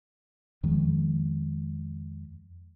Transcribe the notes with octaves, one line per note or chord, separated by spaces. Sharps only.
F2 D#3 F3 G#3